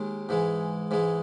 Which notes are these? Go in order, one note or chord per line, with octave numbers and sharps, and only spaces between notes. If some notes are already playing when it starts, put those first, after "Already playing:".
Already playing: D#2 D#3 G#3
G#2 E3 G#3
G#2 E3 G#3